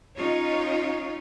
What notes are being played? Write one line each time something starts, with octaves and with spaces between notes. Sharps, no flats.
C#4 D#4 F4 C#5